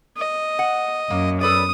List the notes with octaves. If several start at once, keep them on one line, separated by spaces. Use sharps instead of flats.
D#5
F#5
F#2 A#3
A4 B4 D5 D#6